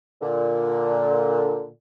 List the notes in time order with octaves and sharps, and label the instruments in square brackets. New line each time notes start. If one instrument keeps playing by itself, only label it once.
[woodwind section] A#2 D3